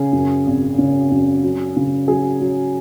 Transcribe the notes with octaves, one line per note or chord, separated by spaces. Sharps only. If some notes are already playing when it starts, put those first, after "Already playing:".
Already playing: C#3 G#4
F#2
G#1
C#3
F#2
F#3
C#3
F#3 G#4
F#3